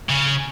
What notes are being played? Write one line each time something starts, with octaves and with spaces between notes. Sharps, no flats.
C#3